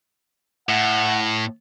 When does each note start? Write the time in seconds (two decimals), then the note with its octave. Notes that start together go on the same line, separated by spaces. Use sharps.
0.69 A2 F#5